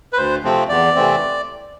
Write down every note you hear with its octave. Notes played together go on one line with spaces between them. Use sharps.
B4
D2 C5
C3 F3 A3 C4
E2 D5
C3 E3 A3 C4